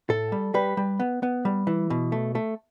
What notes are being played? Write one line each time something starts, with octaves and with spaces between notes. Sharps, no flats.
A2 A4
G3
G3 B4
G3
B3
B3
G3
E3
B2
A3
A3